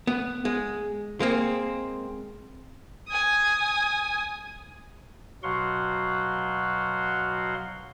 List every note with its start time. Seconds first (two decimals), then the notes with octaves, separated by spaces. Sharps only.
0.07 B3
0.45 G#3
1.20 G#3 A#3 C4
3.10 G#5 D#6
5.43 B2 F#3 F#4 F5 F#5 C6